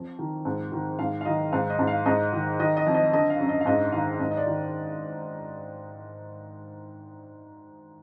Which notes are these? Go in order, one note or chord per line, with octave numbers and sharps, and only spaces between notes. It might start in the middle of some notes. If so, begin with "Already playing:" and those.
Already playing: F2
D#3
G#2
D#3
G#2 F5
F5
D#3 D#5
G#2 F5
D#5
G#2
F5
G#2 D#5
D#3
D#3 D#5
D#5
F2
D#5
D3 D#5
F5
F#2
D#5
F5
G#2 D#5
D#3 F5
G#2 D#5
D#5
D5
D#3